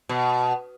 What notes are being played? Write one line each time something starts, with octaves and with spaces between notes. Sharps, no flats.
B2